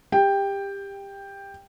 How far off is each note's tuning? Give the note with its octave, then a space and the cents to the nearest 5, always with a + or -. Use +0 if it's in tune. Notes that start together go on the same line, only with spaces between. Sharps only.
G4 +20 G5 +10